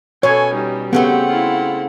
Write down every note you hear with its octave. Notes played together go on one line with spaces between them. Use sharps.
B2 C#4 A4 C#5 G#5
G3 D#4
C#3 A3 B3 C4 G4 F#5
E4 F4